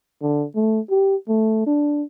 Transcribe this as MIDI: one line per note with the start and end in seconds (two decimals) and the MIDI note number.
0.22 0.45 50
0.55 0.80 57
0.90 1.16 67
1.28 1.63 57
1.66 2.03 62